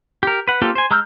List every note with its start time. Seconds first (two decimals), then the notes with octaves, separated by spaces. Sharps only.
0.23 G4 A#4
0.48 B4 F#5
0.62 A#3 C4 F4 G4 A4
0.75 C5 G#5
0.91 G#3 A#5 E6 F6 G6